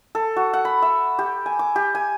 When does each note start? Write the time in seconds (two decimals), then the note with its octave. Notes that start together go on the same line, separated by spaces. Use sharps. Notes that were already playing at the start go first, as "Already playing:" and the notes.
0.15 A4
0.36 F#4
0.54 F#5
0.65 B5
0.82 E5
1.19 G4
1.46 G#5
1.59 D6
1.76 G4
1.95 G#5